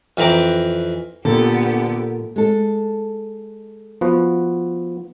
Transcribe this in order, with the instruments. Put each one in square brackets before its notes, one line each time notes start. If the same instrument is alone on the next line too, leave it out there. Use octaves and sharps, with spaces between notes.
[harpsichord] F2 E3 C4 A#5 D6
[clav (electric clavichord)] A#2 [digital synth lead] D3 [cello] B3 G4 [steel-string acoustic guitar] A4
[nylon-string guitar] G#3 A4
[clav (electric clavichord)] F3 B3 F#4